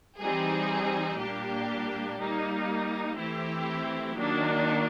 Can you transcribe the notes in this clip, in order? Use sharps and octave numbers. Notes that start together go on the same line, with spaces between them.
E3 G3 C4 D#4 G#4
A#2 G3 A#3 D4 G4
G3 A#3 D#4
E3 A3 C4 E4 G4
D#3 F#3 A#3 D4